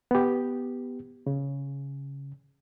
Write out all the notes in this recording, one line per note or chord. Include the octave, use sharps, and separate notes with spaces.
B3 G4
C#3